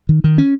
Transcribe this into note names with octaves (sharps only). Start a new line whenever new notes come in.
D#3
D#3
C#4